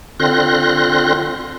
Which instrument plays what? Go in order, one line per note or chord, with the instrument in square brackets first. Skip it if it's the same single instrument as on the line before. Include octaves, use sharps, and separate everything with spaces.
[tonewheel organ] D3 C4 F4 C6 F#6 A#6